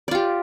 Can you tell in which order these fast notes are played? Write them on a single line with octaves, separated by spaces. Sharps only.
D5 F4 G4